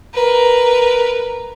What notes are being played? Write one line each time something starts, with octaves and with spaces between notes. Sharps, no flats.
A#4 B4